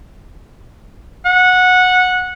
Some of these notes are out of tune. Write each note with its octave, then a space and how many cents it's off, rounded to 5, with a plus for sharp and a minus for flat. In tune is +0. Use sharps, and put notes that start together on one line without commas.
F#5 -15